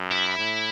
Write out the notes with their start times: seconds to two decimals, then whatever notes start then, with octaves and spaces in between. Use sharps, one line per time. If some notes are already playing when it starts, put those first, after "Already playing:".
Already playing: F#2
0.12 E4
0.38 A2